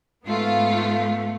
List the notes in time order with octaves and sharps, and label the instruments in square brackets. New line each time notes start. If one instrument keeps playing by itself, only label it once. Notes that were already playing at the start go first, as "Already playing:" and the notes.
[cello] G#2 A3 [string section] B3 F4